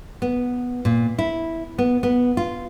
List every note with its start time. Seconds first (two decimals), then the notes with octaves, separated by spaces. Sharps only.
0.22 B3
0.85 A#2
1.19 E4
1.78 B3
2.03 B3
2.37 F4